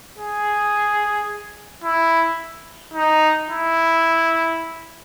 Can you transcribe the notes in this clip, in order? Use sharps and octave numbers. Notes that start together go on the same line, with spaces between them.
G#4
E4
D#4
E4